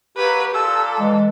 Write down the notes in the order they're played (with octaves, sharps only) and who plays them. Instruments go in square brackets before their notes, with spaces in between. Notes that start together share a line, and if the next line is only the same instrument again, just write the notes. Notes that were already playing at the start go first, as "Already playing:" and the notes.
[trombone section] F#3 A#3 [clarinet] G4 [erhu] B4
[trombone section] A#2 F4 [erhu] A4 [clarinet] E6
[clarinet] E3 [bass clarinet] G#3